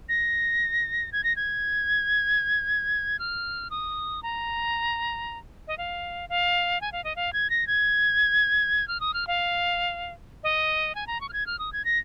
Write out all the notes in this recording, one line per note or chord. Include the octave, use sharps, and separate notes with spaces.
A#6
G#6
A#6
G#6
F6
D#6
A#5
D#5
F5
F5
G#5
F5
D#5
F5
G#6
A#6
G#6
F6
D#6
F6
F5
D#5
G#5
A#5
C#6
F6
G#6
F6
D#6
G#6
A#6